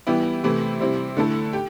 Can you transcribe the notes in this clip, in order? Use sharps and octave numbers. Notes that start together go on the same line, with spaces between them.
E3 G3 B3 E4 G4
C3 E3 A3 E4
C3 G3 C4 E4
D3 A3 E4 A4
G4